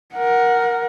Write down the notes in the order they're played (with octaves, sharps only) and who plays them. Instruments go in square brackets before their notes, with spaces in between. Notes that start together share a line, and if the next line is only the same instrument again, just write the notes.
[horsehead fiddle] A#4 F#5